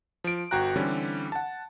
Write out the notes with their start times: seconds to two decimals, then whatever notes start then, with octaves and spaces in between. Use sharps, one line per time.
0.24 F3 D7
0.51 G1 F#4 G5 A#5 F#6
0.76 D3 E3 G3 C4 C#4
1.32 F#5 A5